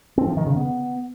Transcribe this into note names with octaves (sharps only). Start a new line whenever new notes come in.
C4
F3
D#3
C#3
B3